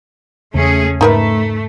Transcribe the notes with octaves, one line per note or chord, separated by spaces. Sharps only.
E2 C#3 A3 C#4 G#4
G#2 A3 D#4 A#4 B4